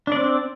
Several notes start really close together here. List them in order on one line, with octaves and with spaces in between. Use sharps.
D4 D5 C4